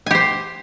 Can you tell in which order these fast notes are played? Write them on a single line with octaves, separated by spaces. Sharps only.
G#5 G4 C5